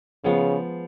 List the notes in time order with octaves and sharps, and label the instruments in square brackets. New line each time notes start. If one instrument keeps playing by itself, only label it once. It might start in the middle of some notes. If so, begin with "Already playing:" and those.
[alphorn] C#3 [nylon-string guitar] F3 G#3 B3